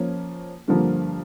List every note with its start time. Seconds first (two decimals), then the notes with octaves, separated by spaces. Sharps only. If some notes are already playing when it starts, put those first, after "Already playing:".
Already playing: F3 A#3 C#4
0.68 G2 D3 F3 A#3